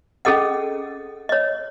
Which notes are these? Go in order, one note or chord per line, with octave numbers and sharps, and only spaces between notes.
C#4 G#4 A4 D#5 F#5
C#5 D#5